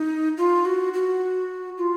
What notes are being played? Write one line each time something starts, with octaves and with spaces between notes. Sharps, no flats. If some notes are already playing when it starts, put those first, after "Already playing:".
Already playing: D#4
F4
F#4
F#4
F4